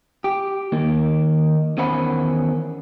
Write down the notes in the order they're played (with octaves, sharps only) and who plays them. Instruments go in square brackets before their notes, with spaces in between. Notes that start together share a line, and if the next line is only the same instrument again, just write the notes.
[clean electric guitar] G4
D#2 A#3 D#4
E2 D#3 C#4 C5 F#5 B5